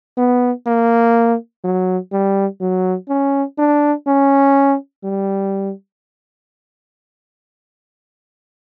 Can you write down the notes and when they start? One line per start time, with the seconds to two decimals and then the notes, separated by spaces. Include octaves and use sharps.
0.18 B3
0.67 A#3
1.64 F#3
2.13 G3
2.61 F#3
3.09 C#4
3.59 D4
4.08 C#4
5.04 G3